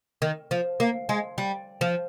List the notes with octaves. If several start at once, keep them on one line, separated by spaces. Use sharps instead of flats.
D#3
F3
A#3
G#3
G3
F3